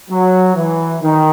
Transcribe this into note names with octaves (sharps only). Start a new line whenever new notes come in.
F#3
E3
D#3